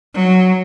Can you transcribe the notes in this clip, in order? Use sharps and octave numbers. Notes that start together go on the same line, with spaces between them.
F#3